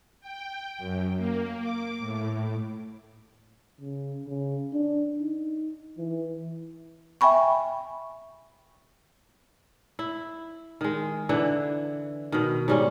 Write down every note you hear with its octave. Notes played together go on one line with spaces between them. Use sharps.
G5
F#2
A#3
D6
A2
C#3
C#3
D4
D#4
E3
E5 G5 G#5 B5 C#6
E4
D#3 G#3
D3 E3 E4
B2 D#3
G#2 G3 C#4